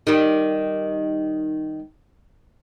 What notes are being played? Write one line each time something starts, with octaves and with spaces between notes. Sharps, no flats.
D#3 G3